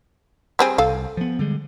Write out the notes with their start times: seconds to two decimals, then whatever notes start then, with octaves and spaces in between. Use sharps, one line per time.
0.59 G3 C4 G#4
0.78 C2 A4 F5
1.17 F3 B3
1.39 D3 G3 G#3